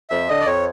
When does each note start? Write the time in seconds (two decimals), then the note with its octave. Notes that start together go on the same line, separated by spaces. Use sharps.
0.10 F2 E5
0.29 D3 D#5
0.41 D5
0.46 F2 C#5